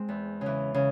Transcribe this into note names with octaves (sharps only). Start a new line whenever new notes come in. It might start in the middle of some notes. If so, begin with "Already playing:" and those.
Already playing: G#3 C4
E2
C#3 E3
C#3